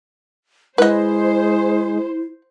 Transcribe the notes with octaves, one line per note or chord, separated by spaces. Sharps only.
G#3 E4 B4 C5 D#5